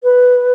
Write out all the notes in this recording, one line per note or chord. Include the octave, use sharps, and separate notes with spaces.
B4